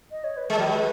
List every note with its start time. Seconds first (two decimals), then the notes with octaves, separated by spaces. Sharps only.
0.11 D#5
0.24 C#5
0.37 B4
0.50 G#3 A#4
0.58 F#3
0.66 G#3 B4